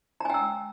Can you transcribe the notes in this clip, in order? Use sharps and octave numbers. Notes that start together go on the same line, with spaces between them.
G5 G#5 A#5 E6